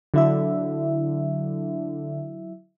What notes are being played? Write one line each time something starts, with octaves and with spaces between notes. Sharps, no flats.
D3 F#3 E4 E5